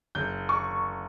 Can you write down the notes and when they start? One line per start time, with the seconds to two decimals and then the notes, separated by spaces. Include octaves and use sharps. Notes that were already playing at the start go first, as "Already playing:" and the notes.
0.15 F#1 G6
0.49 C#6